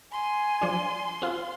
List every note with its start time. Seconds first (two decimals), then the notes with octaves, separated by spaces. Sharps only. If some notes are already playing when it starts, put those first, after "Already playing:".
0.12 G#5 C6
0.62 F3 D4
1.22 C4 F4